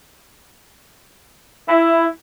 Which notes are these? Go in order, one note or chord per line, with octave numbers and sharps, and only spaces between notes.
E4